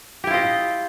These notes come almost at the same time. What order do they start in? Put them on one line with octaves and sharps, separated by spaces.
G4 E4 F4 D#5